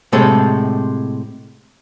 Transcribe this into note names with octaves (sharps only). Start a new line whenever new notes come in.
A2 C3 G#3 A4